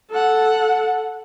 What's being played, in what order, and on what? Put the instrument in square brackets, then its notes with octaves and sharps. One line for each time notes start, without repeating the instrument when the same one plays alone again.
[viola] A4 F#5